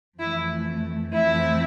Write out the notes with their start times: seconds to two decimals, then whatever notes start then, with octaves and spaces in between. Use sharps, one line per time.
0.19 F2 E3 A3 E4 E5
1.13 F2 E3 A3 C4 E4 E5